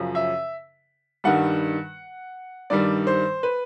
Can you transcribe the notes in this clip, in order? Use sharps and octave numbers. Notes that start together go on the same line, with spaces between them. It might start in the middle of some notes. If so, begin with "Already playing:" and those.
Already playing: F#2 C#3 F3
E5
G2 D#3 G3 F#5
G2 D#3 G3 D5
C5
B4